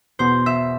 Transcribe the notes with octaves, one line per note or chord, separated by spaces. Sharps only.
E2 B2 B3 C5
E5